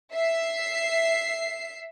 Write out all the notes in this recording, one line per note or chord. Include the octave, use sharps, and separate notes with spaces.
E5 C7